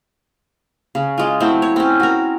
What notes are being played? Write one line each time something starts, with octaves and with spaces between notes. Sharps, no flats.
C#3
G#3 F4
F#3 A3 C4 E4
C#5
C4 C#4
F#4 A#4